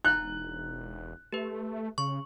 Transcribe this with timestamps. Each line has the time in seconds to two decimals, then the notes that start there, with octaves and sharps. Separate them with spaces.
0.05 E1 D#4 A#5 F#6
1.33 A3 G4 B4
1.98 C#3 C#6